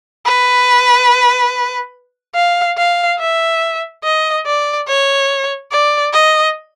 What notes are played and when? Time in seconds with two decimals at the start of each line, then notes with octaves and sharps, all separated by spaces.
0.26 B4
2.35 F5
2.78 F5
3.19 E5
4.04 D#5
4.46 D5
4.88 C#5
5.71 D5
6.13 D#5